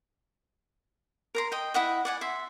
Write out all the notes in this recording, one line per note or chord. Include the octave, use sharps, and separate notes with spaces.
A#4 A#5 C6
D#5 G5
E4 D#5 F#5 D#6
D5 F#5 G#5
E5 C6